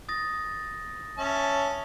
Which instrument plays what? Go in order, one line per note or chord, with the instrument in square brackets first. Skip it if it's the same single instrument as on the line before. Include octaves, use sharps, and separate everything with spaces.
[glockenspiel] D#6 A6 A#6
[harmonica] C#4 E5 A5